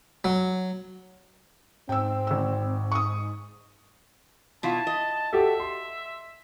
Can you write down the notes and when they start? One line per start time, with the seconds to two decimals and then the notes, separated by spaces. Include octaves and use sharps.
0.24 F#3
1.89 G#2 C4 G5 E6
2.27 G#1 E6
2.92 C#6 D#6
4.63 B2 E4 F4 A5
4.87 D#5
5.33 F#4 G4 A4 E5
5.60 C6